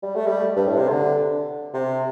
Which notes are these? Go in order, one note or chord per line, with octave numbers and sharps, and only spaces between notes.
G3
A3
G3
G2
A2
C3
D3
C3